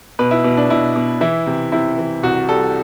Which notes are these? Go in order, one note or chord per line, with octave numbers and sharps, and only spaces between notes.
B2 B4
E4
B2
D4
B2 E4
B2
E3 E4
C3
C3 E4
E3
C2 F#4
G3 A4